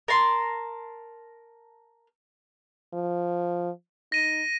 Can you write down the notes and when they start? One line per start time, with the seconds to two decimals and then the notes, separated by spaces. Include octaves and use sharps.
0.08 A#4 A5 C6
2.93 F3
4.12 D#4 A#6 D#7